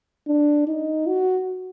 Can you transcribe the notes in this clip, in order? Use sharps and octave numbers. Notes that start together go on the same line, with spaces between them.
D4
D#4
F#4